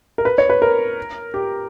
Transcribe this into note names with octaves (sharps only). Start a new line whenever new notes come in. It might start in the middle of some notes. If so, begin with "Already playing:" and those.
A#4
B4
C#5
B4
A#4
G4